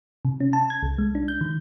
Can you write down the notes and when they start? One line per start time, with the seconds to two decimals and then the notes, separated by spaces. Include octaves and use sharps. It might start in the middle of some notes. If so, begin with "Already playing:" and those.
0.25 C3
0.40 C#4
0.53 A5
0.70 G#6
0.83 C2
0.98 G#3
1.15 D4
1.28 G6
1.41 D#3